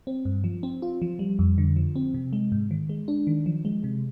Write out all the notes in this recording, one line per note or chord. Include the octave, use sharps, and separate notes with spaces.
C4
G2
F3
C4
F4
F3
G3
F2
D3
F3
C4
C3
G#3
G#2
D#3
G#3
D4
D#3
F3
G#3
C3